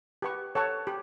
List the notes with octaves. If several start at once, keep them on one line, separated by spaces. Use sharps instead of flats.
G4 B4 F#5 C#6
A4 C#5 F#5 A5 C#6
G4